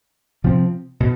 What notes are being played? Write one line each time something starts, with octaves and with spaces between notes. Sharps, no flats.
C3 F3 C4
B2